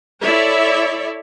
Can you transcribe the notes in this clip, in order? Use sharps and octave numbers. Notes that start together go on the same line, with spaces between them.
E4 A4 C#5 D5 E5